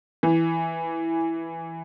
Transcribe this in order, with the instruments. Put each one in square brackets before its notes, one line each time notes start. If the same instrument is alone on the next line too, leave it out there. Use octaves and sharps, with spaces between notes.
[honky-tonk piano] E3